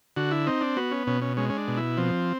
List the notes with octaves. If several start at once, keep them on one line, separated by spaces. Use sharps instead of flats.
D3 F#4
E4
C4 D#4
D4
B3 F#4
C#4
B2 C#4
C#4
G#3 C#4
C#4
D4
B2
E4
F3 C4